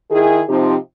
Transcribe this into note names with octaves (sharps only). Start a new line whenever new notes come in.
D#3 E4 G#4
C3 F3 C4 D#4 G4